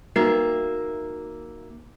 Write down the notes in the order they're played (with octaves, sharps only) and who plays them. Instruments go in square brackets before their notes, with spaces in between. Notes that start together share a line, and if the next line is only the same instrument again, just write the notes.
[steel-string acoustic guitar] A#3 E5 [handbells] D#4 F#4 C7